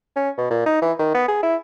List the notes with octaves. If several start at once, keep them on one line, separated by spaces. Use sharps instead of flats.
C#4
B2
A#2
D#4
E3
D#3
B3
G#4
E4